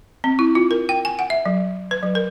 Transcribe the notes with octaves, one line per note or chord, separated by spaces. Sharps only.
C4
E4
F4
A#4
G5
G#5
F#5
E5
F#3
B4
F#3
A#4